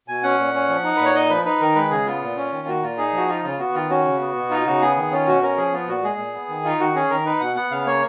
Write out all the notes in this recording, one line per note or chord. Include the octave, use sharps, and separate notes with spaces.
B2 G#5
C#4 F#5
A#2
C#4
F3
D#4
A#2 B4
C#5
D#4 D#5
F3 B4
D#4 B4
D#3 A#4
G#3 B4
C#3 G#4
B3 F4
A#2
C#4
D#3
A#3 F#4
A#2 F4
D#4 G#4
F3 F#4
D#4 F4
C#3 F4
B3 F#4
D#3 F4
C#4 F#4
C#3
B3
B2
D#4 F4
C#3 F#4
B3 G#4
D#3
C#4 F4
B2 F#4
C#4 A#4
F3 G#4
B3 F4
A#2 F#4
G#3 G#4
A#2
B3
D#3
D#4 F4
D#3 F#4
C#4 G#4
D#3 A#4
D#4 B4
B2 F#5
B3 F#5
C#3 F5
A#3 C#5